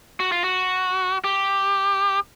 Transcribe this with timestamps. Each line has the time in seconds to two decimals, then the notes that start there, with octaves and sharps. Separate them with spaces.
0.20 F#4
0.32 F4
0.44 F#4
1.24 G4